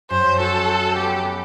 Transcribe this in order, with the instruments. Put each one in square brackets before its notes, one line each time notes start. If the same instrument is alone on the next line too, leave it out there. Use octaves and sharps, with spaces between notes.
[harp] F#2 [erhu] C5
[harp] F#4 [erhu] A4
[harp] F#4
[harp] B3 [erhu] G4
[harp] B3